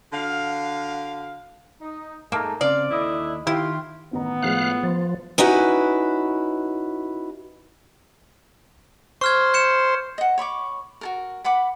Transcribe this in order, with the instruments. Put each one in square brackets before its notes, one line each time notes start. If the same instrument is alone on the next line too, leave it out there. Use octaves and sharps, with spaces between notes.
[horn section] D3 F#4 F5
D#4
[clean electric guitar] G#2 A5 A#5 [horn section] A3 D#4 G#4 [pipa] A#3
[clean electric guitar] C#3 C4 [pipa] D5 [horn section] F5
[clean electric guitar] D#2 D#5 [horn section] D3 D4 E4
[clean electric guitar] D#3 [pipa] E4 [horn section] F4 G4
[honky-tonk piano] A1 D#3 A#5 [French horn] B3
[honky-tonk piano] A2 F3 G#3 [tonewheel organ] F5 F#6
[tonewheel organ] F3 [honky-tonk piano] A6
[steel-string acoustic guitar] C#4 D#4 E4 F#4 B4
[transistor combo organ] C5 [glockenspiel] C#6 F6 G#6
[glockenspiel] G6 C#7 E7
[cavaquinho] D#5 F#5
C#5 B5 C#6 D6
F#4 A4 A#4
B4 F#5 B5 D6